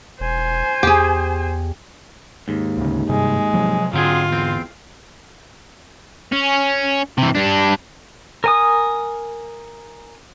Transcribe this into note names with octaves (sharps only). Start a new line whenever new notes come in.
E1 C5 G#5
E2 G4 G#4
D#2 G#2
D2 C#3
G2 C3 G3 G#3
C3 F3 F#3
G#2 D3 F#3 C4 F4 G#4
E2 C4
C#4
C3 E3
G3 D4
A#4 G#5 D#6